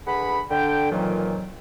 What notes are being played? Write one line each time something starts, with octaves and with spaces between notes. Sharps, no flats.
D3 G#4 B4 F#5 B5
D3 G5
F2 A#2 D#3 E3 F#3